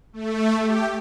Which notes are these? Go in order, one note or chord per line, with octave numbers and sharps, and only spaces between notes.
A3
G4